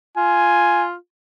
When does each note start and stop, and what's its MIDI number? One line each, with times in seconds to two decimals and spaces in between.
0.17 0.95 65
0.17 0.84 80